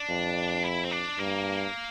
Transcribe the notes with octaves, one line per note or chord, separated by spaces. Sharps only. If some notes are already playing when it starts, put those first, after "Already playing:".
Already playing: D4
F2
E4
C4
D4
G2 A#3